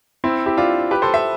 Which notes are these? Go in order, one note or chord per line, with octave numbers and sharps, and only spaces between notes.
C4 E4
E4 G4
D4 F4
G4 B4
A4 C5
C5 E5